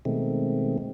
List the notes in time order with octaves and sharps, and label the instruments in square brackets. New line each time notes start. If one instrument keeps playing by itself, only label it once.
[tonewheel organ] B2 D#3 G#3 A3 C4